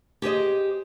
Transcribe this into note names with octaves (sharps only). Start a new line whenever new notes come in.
G4 G#4 C5 D#5